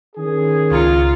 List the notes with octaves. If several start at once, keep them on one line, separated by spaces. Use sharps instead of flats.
D#3 C#4 G#4
C#2 F4 A#5 C#7